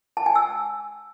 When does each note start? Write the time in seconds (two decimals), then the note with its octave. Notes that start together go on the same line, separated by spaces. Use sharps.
0.17 A5
0.26 G#5
0.35 E6